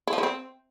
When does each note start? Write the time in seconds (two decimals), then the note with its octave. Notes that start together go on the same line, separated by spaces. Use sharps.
0.07 E4
0.13 F3
0.18 E4
0.23 C4